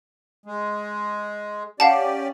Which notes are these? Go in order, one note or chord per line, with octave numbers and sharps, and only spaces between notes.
G#3
C#4 G4 D5 F5 F#5 A5